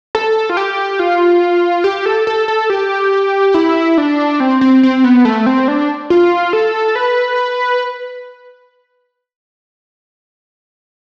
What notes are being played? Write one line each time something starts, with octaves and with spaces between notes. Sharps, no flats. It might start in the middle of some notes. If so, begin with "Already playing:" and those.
A4
F4
G4
F4
G4
A4
A4
A4
G4
E4
D4
C4
C4
C4
B3
A3
C4
D4
F4
A4
B4